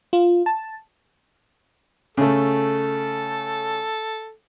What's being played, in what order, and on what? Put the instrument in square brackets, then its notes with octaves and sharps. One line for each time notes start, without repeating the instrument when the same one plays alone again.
[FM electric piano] F4
A5
[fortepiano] C#3 A3 [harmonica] A4